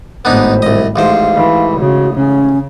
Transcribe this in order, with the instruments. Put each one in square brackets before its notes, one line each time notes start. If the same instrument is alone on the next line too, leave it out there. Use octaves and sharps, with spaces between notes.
[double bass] G#1 A2 [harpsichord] B3 D4 D#4 [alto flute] C5
[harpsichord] C2 D#5
[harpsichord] A1 G#2 C5 [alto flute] F5
[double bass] E3
[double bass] C#3 [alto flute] F#4
[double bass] C#3 [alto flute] C#4